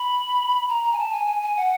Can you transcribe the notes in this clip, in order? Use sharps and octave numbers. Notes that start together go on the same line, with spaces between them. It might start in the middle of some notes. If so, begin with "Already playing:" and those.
Already playing: B5
A#5
A#5
G#5
A5
G#5
G#5
G#5
F#5